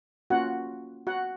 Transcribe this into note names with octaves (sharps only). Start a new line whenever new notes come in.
A#3 C#4 F4 F#4 F#5
F#4 F#5